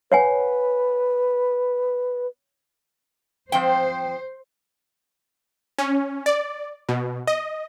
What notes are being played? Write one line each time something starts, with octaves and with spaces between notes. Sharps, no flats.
B4 C#5 F#5 G#5
F3 C4 C5 G5
C#4
D5
B2
D#5